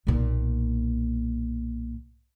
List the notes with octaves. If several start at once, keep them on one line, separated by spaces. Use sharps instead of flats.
B1 A#2